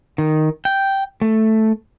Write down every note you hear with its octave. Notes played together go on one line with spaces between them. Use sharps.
D#3
G5
A3